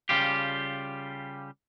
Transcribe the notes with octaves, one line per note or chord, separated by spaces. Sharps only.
C#3 G3 F4 G4